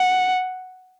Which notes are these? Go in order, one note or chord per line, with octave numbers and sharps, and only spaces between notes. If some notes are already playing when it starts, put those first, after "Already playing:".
Already playing: F#5